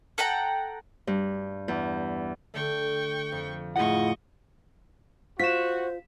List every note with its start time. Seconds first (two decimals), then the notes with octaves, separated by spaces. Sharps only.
0.18 A4 F#5 G5 A#5
1.07 G2
1.68 E2
2.54 D3 A3 G5 C#6
3.32 F2
3.76 A2 E4 F4 G#4 D#5 F#5 C#6
5.39 F4 F#4 C5 B6 E7